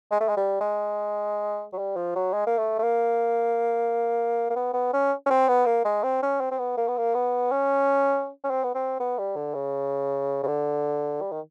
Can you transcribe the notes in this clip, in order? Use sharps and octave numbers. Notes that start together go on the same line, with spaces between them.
G#3
A3
G#3
G3
G#3
F#3
G3
F3
F#3
G#3
A#3
A3
A3
A#3
A#3
B3
B3
C#4
C#4
C4
B3
A#3
G#3
C4
C#4
C4
C4
B3
A#3
B3
A#3
B3
C#4
C#4
C4
B3
C4
B3
G3
D3
C#3
C#3
D3
G3
D#3